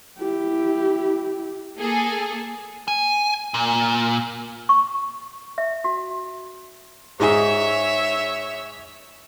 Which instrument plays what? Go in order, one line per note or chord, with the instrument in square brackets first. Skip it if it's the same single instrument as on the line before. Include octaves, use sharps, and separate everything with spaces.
[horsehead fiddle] E4 G4
[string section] A#3 G#4 A4
[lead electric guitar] G#5
A#2
[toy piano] C#6
E5
F#4
[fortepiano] G#2 D#4 G#4 [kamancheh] C#5 E5